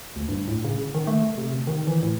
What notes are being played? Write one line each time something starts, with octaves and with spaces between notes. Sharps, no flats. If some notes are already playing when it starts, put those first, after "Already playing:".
D2
G2
A2
C#3
D#3
A3
C3
D#3
E3
A2